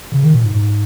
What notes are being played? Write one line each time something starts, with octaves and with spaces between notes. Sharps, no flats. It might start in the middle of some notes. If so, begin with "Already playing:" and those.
C#3
D#3
A#2
G#2
G#2